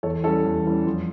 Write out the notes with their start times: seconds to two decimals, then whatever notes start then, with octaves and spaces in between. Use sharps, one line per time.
0.03 E2 A4 C#5
0.24 E3 G3 C#4 A4 C#5
0.45 E2
0.66 E3 G3 C#4
0.86 F2